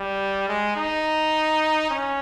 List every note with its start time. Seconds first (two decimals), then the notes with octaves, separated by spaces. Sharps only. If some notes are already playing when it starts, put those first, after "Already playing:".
Already playing: G3
0.48 G#3
0.76 D#4
1.90 C#4